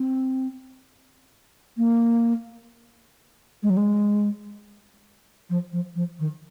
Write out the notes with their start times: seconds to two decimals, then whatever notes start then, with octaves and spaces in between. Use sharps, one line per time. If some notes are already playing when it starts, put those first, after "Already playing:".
Already playing: C4
1.77 A#3
3.63 G#3
3.69 F#3
3.76 G#3
5.49 F3
5.72 F3
5.95 F3
6.19 D#3